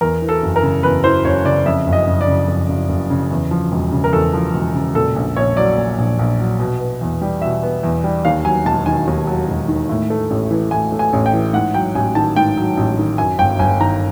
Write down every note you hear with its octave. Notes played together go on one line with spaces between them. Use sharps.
E2 A#4
E3
A4
F#1
A#4
C#3
E2 B4
E3 C5
F#1 C#5
C#3 D5
F2 E5
F#1
D#5
F#1
D5
C#3
F2
F#1
F#1
C#3
E2
F3
E1
C#3
A#4
E2 A4
F3
E1
C#3
A#2 A4
A#1
A#1 C#5
F#3 D5
A#2
A#1
A#1
F#3
B2
B3
E2
G3
B2 E5
B3
E2
G3
D#2 F5
F#3 G#5
E1 A5
D#3 G#5
D#2
F#3
E1
D#3
A2
A3
A1
E3
A2 G#5
A3
G#5
A1
G5
E3
G#2 F#5
F#3 G5
A1 G#5
D#3 A5
G#2 G5
F#3
A1
D#3
F#2 G#5
G1 G5
G1 G#5
D#3 A#5